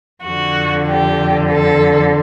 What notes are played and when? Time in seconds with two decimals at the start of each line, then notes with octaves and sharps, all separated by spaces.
0.24 F2 D3 F#4
0.88 G4
1.52 A4